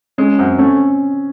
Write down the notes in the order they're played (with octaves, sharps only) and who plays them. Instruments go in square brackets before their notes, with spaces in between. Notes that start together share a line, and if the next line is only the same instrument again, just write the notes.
[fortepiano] G#3 [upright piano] C#4
[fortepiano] F#2 [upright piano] C4
[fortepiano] A3 [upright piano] C#4